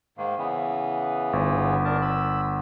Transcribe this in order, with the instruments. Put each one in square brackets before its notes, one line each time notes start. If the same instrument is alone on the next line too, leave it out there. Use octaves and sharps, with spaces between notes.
[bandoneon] G#2 D#3 A#3
C#3 E3 B3
[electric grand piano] G1
[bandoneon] D4 A#4 A5
B5 E6